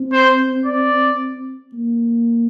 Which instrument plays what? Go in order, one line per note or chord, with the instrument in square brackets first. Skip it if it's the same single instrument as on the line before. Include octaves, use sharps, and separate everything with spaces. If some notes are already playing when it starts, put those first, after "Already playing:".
Already playing: [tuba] C4
[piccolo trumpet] C5
D5
[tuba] A#3